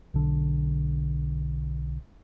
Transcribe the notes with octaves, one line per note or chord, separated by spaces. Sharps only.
B1 D3